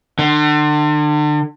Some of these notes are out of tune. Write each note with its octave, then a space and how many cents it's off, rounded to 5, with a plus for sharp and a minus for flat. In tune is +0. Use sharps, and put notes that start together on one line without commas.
D3 +35